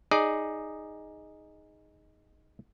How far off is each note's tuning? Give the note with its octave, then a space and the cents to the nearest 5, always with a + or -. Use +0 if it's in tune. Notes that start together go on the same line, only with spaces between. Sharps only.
D#4 +0 G#4 +0 D5 +10